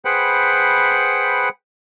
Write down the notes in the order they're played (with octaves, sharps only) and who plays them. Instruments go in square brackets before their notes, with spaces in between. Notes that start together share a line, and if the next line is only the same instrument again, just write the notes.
[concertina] G#4 B4 C5 F#5 G5 B5